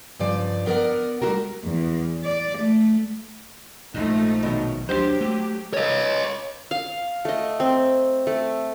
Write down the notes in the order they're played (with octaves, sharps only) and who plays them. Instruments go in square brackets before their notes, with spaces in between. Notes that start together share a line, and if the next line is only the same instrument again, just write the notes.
[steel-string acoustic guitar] G2 C#3 F3 D5
B3 A#4 B4 D5 F#5
G3 A3 C4 F4 F#4 A#4
[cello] E2
D5
A3
[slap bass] A#1 G#2 [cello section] F3 A3 D#4
[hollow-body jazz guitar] B2 D#3 F#3
[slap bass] D2 A3 D4 [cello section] F#3 G4 [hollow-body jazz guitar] C5
[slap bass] A3
[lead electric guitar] C#5 D#5
[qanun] F5
A3 D#5
C4
A3